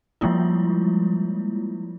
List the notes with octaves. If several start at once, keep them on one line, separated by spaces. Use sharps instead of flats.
F3 G3 G#3 A#3 E4 F4